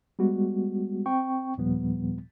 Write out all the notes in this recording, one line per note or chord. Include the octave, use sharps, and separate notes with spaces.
G3 G#3 B3 F#4
C4 G5 C#6
D#2 A#2 F3 G3 B3